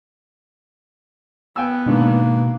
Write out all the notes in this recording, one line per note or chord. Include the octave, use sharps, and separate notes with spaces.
B3 G5 G#5 E6
G#2 B2 D3 D#3 A#3